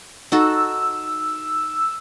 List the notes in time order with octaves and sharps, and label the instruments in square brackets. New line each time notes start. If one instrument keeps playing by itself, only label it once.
[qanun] D#4 F#4 A4 [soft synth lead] E6